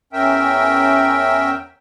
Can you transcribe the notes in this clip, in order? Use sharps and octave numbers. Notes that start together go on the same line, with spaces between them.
E2 C#4 A#4 E5 G5